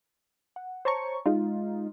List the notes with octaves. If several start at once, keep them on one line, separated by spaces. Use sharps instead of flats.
F#5
C5 C#5 A5 A#5 C#6
G#3 D#4 F4